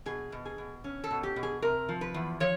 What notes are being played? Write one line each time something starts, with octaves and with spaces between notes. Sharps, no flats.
B2 G#4
B2
G#4
B2
C#4
A4
B2
G4
B2
G#4
C3 A#4
F3
B4
E2
F3 C#5